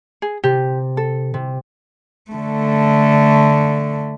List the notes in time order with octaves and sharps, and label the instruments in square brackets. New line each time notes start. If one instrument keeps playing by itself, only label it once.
[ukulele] G#4
[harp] C3 [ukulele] G4
[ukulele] A4
[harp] C3
[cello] D3 A3